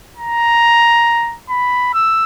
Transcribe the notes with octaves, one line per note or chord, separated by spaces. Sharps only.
A#5
B5
E6